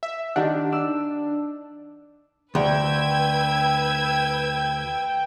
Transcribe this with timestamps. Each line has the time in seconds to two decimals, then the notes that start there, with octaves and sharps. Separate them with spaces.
0.03 E5
0.36 D#3 D4 D#4 G4 F#5
0.72 D5 E6
2.55 D2 B4 G5 E6 G#6